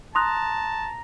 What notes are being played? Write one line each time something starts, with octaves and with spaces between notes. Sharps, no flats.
A5 A#5 C6 D#6 F#6 A#6 F7